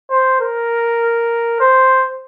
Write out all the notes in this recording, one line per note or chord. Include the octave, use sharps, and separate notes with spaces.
C5
A#4
C5